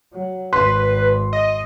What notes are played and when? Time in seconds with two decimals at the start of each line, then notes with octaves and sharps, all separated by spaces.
0.13 F#3
0.53 G#1 B4 C6
1.33 D#5